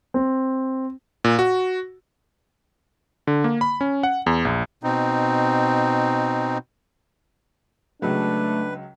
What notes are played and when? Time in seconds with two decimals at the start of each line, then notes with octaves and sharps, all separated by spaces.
0.14 C4
1.24 A#2
1.39 F#4
3.27 D3
3.44 A#3
3.61 B5
3.81 C#4
4.03 F#5
4.26 E2
4.45 A#1
4.84 B2 C4 D#4
8.02 C#2 C#3 F#3 A3 D4 B4